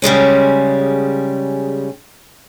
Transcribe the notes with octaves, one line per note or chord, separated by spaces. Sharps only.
C#3 G3 G#3 C#4